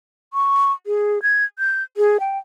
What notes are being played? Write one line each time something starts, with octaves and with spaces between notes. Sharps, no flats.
C#6
G#4
G#6
G6
G#4
G5